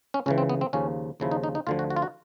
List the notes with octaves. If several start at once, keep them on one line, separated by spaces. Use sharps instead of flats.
C#4
C#2 C#3 E3 C#4
C4
B3
C4
D#2 C#3 F3 C#4
D#2 C#3 F3 E4
D#4
D#4
D#4
D2 D3 F3 F4
F#4
F#4
F4
F#4